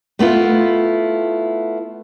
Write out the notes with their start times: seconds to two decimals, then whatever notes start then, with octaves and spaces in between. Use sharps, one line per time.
0.19 A3 B3 E4 F4